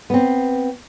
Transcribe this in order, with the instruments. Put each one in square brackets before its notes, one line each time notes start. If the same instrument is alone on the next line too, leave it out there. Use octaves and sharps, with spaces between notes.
[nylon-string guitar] B3 C4